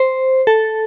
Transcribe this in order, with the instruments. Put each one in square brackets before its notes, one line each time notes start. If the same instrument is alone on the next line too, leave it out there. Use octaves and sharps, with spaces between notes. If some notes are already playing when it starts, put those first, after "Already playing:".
Already playing: [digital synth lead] C5
A4